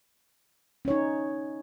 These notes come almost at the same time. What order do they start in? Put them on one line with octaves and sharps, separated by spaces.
C#4 C#5 D#4